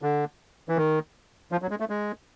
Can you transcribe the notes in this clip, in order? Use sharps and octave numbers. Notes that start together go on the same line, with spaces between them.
D3
E3
D#3
F3
F#3
G#3
A3
G#3